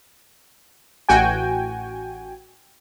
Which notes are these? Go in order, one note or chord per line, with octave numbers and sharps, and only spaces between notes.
A1 F#4 G5 G#5